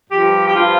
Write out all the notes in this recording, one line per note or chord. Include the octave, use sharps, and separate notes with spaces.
G2 F3 G4
G4
G2 F3 F4